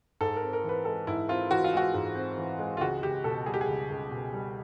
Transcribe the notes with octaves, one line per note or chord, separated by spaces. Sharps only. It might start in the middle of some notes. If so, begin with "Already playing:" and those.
G#2 A4
A#4
C4
A#4
E3
B4
G#3 A4
G#2 E4
C4 F4
E3 F#4
F4
G#3 F#4
G#2
C4
E3
G#3
F4
C#2 F#4
C#2 G4
B2 A4
G3 G#4
G4
G#4
C#2
C#2
B2
G3